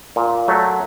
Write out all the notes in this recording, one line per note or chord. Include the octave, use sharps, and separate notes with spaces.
A#2
F#3 A3